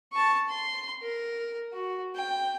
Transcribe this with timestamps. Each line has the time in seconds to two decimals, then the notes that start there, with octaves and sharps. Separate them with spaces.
0.12 A5 C#6
0.48 C6
1.02 A#4
1.73 F#4
2.15 G5